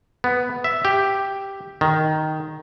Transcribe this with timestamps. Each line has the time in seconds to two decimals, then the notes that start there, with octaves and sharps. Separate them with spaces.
0.24 B3
0.64 E5
0.85 G4
1.81 D#3